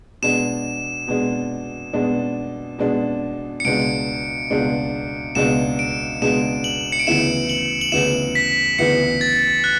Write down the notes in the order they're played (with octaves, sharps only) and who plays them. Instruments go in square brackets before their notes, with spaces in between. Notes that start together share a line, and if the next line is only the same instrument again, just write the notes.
[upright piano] B2 G#3 D4 [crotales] E7
[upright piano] B2 G#3 D4
B2 G#3 D4
B2 G#3 D4
[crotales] C#7
[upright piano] C#2 B2 G#3 D4 [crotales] D7
[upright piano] C#2 B2 G#3 D4
[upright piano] C#2 B2 G#3 D4 [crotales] E7
[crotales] D7
[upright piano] C#2 B2 G#3 D4 [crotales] E7
[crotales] F#7
C#7
D7
[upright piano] D2 C#3 E3 B3 E4 [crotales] E7
[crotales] F#7
F#7
[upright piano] D2 C#3 E3 B3 E4 [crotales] E7
[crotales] B6
[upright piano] D2 C#3 E3 B3 E4 [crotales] C#7
[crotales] A6
F#6